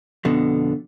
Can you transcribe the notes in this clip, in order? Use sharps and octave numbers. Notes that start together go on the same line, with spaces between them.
F2 B2 D3